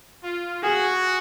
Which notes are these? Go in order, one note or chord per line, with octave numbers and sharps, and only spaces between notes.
F4
F#4 G#4